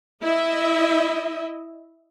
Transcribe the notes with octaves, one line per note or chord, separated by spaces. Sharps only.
E4 D#5 E5